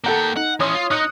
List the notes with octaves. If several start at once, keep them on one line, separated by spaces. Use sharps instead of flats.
A#3 A4 F#5 G5 A#5
D#4 F#5
E3 C#4 C#5 C6 D#6
F4
D#4 D#6 F#6 C#7